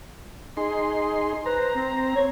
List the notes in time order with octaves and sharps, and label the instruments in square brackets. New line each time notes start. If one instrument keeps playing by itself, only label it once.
[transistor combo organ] D#4 G#4 C6
[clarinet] B4 [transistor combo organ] C5 A#5
[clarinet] C4
C#5